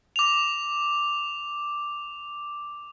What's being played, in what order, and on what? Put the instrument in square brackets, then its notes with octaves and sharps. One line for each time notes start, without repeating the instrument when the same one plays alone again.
[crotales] D6 F7